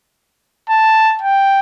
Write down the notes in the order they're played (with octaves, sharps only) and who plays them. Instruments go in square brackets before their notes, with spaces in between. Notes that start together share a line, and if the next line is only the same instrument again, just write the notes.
[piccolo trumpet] A5
G5